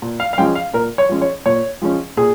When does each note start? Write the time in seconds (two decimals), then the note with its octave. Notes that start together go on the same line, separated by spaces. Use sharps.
0.02 A#2
0.20 F5
0.33 F5
0.38 F3 G#3 C#4 G5
0.55 F5
0.74 A#2 A#4
0.98 C#5
1.09 F3 G#3 C#4
1.22 C#5
1.46 A#2 C#5
1.82 F3 G#3 C#4
2.17 A#2 G#4